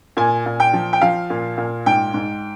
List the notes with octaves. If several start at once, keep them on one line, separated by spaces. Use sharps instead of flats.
A#2 G#5
A#2
G5
F3
G5
F3 F5
A#2
A#2
G#2 G5
G#2